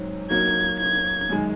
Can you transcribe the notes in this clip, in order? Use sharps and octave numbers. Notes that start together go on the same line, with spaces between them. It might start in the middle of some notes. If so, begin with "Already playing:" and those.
Already playing: G#2 F#3 C4 D#4
F#3 A#3 D#4 F#4 G#6
G#6
F#2 D#3 G#3